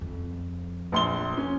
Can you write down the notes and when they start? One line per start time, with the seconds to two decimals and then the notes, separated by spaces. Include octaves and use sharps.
0.01 F2
0.92 A#1 C6 G7
1.37 C#4